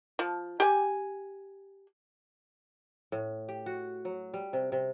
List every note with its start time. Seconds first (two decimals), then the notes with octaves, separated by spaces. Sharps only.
0.19 F3
0.60 G4 G#5
3.12 A2
3.49 G4
3.66 F#4
4.05 F#3
4.34 G3
4.53 C3
4.72 C3